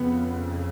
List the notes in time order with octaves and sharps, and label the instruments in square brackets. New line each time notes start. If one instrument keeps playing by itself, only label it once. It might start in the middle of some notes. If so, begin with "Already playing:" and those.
Already playing: [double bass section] F2 C#3 B3